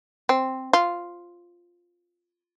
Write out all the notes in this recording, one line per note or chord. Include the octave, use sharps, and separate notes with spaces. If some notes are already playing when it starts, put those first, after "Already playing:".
C4
F4